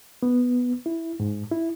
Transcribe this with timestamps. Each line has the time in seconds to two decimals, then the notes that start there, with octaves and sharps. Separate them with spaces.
0.23 B3
0.86 E4
1.20 G#2
1.51 E4